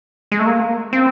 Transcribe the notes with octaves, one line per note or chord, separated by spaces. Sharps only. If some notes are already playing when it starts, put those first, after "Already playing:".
G#3
A3
A#3
C4